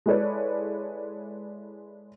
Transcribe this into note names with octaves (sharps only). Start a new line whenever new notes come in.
G#3 E4 A4 B4 C#5 D5